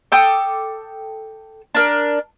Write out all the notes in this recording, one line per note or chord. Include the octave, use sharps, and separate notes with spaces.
A4 G5 D6 D#6
D4 A#4